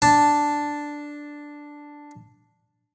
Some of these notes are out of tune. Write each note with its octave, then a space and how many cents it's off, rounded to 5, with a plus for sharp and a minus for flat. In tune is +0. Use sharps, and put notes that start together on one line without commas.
D4 +0 A5 +0